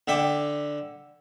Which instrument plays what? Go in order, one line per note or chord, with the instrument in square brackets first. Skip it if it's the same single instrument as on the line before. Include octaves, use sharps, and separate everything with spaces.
[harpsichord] D3 E5 G5 B5 D6